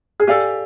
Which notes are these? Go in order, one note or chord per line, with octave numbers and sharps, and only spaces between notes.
G#4
G4 A4 D5 F5 G#5